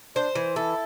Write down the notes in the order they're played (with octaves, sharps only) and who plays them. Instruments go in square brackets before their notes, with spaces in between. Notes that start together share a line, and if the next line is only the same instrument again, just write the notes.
[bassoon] D4 [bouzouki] C5
[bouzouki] E3
[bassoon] E4 [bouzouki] A4